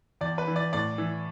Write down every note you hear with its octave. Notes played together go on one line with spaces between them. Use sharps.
E2 D5
B4
E3
D5
A2 D5
E3